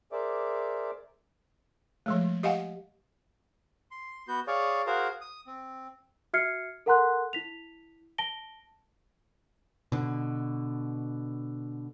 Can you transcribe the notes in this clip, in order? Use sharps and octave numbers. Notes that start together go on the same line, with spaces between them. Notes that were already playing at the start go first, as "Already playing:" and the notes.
G#4 A#4 C5 D5 E5 D6
F3 G#3 A3
G4 D#5 F5 F#5 G#5
C6
B3 F#4 G6
G#4 C#5 D5 F5
F#4 G#4 A#4 C5 F5
D#6
C4
F#4 E5 F6 G#6 C7 C#7
A4 A#4 F#5 A#5 C6 F#6
E4 B6 F7
A5 A#6 D7 G7
B2 D3